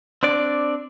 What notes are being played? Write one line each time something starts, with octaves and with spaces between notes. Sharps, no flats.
C4 D4 D5